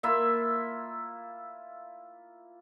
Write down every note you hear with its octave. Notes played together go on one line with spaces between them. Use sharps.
A#3 E4 F4 E5